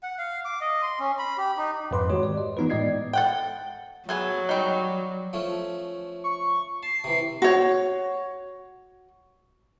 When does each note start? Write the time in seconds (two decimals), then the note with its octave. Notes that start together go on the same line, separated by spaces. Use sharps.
0.03 F#5
0.18 F5
0.45 D6
0.61 D#5
0.82 C6
1.00 C#4
1.19 B5
1.38 G4
1.57 D#4
1.91 F2 G#2 B4 C6 D6
2.10 D#3 G#3 F#4 G4 C#5
2.23 D5
2.38 D#5
2.57 E3 B3 D#4 F4 B4
2.70 A2 G#3 D5 D#5 G#6 C7
3.13 A4 F#5 G5
4.09 F#3 B3 G#4 A4
4.49 G3 D#4
5.33 F3 A3 C#4
6.24 C#6
6.83 A5 C7
7.04 C3 E3
7.42 F#4 C#5